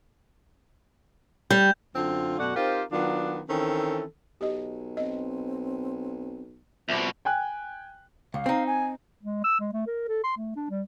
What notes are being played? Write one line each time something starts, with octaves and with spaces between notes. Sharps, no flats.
G3 G6
F#2 D3 C4 F4
F#2 B2 A3 F#4 D5 F#5
C4 D#4 F4 G4 A#4 C5
D#3 F#3 B3 D4 F4
D#3 E3 C4 C#4 A4
B1 G4 D#5
C4 D#5
C2 B2 F3 C5 E5 D6
G5 G#5 F#6
C#2 F5
C4 D#4
G#5
G#3
E6
G#3
A3
A#4
A4
C6
A3
D4
G3